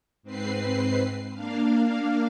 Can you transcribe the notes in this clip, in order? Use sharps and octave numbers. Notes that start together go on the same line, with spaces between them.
G#2 C4 B4 C7
A#3 D4 F5